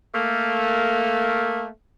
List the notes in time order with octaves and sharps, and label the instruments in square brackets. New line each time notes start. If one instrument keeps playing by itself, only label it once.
[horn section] A3 A#3